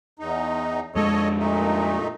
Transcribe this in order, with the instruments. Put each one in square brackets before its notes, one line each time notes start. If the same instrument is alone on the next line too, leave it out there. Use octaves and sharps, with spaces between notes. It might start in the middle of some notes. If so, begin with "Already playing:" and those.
[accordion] E2 D#4
[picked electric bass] F2 G#3 [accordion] A4 C#5 D#5
[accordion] A#2 A3 D#4